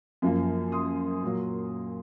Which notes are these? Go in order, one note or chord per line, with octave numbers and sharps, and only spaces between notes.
F#2 F3 A#3
C6 D#6
A#2 F#3 A#3